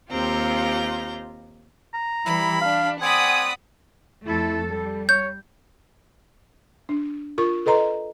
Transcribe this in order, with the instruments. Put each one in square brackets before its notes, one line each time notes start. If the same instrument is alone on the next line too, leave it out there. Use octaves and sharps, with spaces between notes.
[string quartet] D#2 C4 F4 G4 A#5 G6
[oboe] A#5
[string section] E3 G3 [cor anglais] E4 [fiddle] B5
[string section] D4 [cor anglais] F5
[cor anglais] C4 [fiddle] D5 B5 [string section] F#5 D#6 [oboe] G#5
[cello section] F2 A3 A4 [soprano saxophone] E4
[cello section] G3 [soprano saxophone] A4
[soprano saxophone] C#5 [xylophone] G6
[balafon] D4
F4 A#4 C#6
A4 B4 D#5 A#5 C6